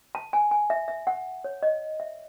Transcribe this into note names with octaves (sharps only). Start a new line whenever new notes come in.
A5
G#5
G#5
E5
E5
F#5
C#5
D#5
E5